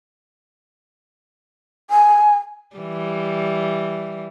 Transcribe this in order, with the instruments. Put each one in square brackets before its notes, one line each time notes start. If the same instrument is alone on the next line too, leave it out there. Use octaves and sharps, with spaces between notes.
[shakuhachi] G#5
[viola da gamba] E3 G3